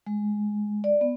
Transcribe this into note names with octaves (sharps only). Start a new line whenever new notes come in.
G#3
D5
B3